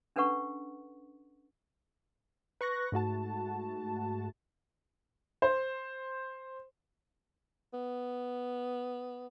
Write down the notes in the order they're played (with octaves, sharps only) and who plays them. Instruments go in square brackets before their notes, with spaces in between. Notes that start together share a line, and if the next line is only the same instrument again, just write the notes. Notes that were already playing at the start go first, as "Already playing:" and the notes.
[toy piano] C#4 D4 A4 B4 F#5 C#6
[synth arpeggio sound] B4 C#6 F#6 A#6
G#2 A3 F#4 A5
[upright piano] C5
[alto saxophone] B3